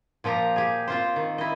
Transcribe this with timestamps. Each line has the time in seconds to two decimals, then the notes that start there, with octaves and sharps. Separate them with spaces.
0.24 A#2 F3 G4 A#5
0.56 G4 G#4
0.88 C4 F4 C5
1.16 D#3
1.38 E4 D#5